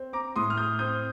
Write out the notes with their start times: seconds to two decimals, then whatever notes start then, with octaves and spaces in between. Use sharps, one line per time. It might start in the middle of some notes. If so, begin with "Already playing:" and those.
Already playing: C4
0.13 A#5 D6
0.36 A2 C6 D#6
0.50 F6
0.57 D#6 G6
0.79 C4 D#6 G6